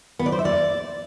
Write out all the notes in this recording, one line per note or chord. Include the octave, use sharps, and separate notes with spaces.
B3
D5
C5
E5
D5